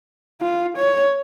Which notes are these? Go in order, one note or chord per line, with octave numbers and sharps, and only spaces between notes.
F4
C#5